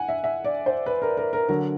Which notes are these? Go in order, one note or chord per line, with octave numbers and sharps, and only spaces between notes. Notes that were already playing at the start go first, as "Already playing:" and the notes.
Already playing: F#5 G#5
E5
E5
D5
C5
B4
A#4
A#4
A#4
D3 F#3 A#4